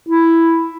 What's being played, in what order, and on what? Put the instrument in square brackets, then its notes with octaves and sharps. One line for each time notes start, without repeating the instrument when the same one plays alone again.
[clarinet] E4